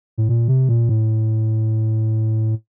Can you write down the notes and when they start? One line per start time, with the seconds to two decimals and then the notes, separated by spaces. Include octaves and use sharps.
0.18 A2
0.29 A#2
0.48 C3
0.69 A#2
0.89 A2